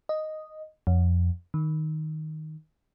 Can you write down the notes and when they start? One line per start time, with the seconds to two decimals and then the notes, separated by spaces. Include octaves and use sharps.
0.09 D#5
0.87 F2
1.54 D#3